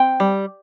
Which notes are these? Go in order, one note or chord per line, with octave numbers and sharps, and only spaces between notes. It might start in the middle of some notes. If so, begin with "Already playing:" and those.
Already playing: C4 G5
G3